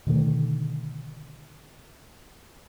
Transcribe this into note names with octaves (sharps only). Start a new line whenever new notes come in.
B2 D3 D#3 A3